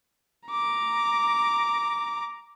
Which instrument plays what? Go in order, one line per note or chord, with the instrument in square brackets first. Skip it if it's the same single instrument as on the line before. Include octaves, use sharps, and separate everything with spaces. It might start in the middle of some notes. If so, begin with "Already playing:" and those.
[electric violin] A#5 D6